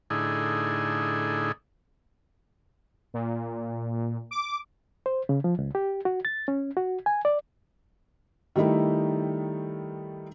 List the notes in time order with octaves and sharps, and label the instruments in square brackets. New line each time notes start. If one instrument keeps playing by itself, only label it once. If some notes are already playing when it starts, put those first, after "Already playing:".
[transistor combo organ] A2 D3 D#4 E4 G#4
[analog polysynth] A#2
D6
[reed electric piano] C5
C#3
F3
C#2
G4
F#4
A6
C#4
F#4
G#5
D5
[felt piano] D#3 G3 A3 D#4 E4